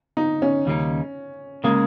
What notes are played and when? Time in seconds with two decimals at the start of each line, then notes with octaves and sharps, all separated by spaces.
0.17 D#4
0.42 C#4
0.66 D#2 C#3 G3 A#3 D#4
1.64 C#3 G#3 A#3